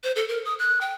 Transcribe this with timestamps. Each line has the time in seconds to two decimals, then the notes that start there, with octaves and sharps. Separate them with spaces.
0.04 C5
0.16 A4
0.28 A#4
0.45 D#6
0.59 F#6
0.81 G5